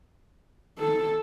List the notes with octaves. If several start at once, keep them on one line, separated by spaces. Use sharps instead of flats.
A4